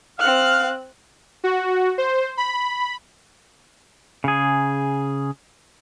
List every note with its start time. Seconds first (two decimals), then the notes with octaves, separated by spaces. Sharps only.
0.20 C4 F5 F6 F#6
1.44 F#4
1.98 C5
2.37 B5
4.24 C#3 G#4